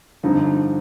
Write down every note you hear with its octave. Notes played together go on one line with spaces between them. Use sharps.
G2 D3 F3 C4 D#4